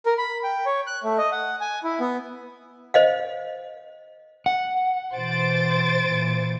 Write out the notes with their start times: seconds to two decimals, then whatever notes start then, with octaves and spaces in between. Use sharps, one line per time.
0.06 A#4
0.18 B5
0.44 G5
0.66 C#5
0.87 F#6
1.04 A3
1.18 D#5
1.32 F#5
1.61 G#5
1.84 E4
2.00 B3
2.94 C5 D#5 F5
4.46 F#5
5.14 B2 E3 C5 A6 D7
6.08 A#2 E3